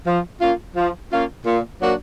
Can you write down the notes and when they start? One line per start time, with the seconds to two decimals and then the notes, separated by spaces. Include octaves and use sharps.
0.06 F3
0.40 A#3 C#4 F4
0.76 F3
1.11 A#3 C#4 F4
1.45 A#2
1.81 F#3 A#3 D4 F#4